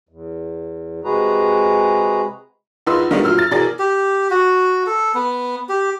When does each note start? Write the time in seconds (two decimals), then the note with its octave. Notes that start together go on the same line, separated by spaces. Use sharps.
0.09 E2
1.04 C3 G#3 F#4 G#4 B4 A#5
2.87 E2 D#4 F4 B4 C6 E6
3.11 D#3 F3 G3 A3 B3 D4
3.24 A#2 F#3 E6 F6
3.37 F6 A6
3.51 B2 E3 G#4 A#4 D5 A6
3.79 G4
4.31 F#4
4.86 A4
5.15 B3
5.69 G4